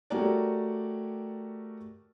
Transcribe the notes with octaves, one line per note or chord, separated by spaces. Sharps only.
A3 F#4 G4 A#4 C#5 D5